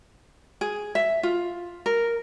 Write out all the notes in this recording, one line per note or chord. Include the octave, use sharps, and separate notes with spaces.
G#4
E5
F4
A#4